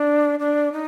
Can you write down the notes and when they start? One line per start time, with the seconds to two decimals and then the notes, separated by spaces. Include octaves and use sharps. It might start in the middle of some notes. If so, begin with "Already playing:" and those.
Already playing: D4
0.39 D4
0.73 D#4